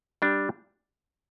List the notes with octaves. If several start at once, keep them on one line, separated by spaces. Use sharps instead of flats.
G3 D4 G4